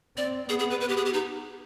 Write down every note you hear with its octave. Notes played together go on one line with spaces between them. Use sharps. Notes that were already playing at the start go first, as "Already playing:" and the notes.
C4 D5
B3 G#4
G#4
B4
B4
G4
G#4
G4
D#4